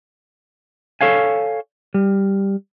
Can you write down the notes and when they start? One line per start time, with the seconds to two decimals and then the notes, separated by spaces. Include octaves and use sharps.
1.01 A4 C#5 F5 G#5
1.94 G3